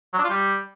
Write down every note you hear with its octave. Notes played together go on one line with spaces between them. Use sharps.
F#3
D4
F4
G3